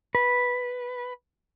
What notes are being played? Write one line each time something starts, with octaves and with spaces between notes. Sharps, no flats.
B4